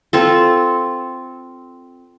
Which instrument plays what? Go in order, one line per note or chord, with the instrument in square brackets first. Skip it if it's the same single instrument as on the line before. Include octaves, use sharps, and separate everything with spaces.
[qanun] C4 F4 A4